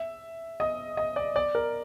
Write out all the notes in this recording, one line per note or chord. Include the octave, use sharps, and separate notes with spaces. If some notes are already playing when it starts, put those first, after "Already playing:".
Already playing: E5
D#5
D#5
D5
D5
A#4